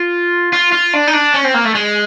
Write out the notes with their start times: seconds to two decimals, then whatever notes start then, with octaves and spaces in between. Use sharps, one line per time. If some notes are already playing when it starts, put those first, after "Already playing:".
Already playing: F4
0.53 F4
0.72 F4
0.93 D4
1.07 D#4
1.13 D4
1.34 C#4
1.44 C4
1.54 A#3
1.65 A3
1.75 G#3